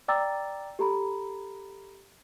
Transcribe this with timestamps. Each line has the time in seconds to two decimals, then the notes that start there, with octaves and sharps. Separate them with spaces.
0.08 D5 G5 A#5 D6 E6 A6
0.79 G4 A4 A#5 B5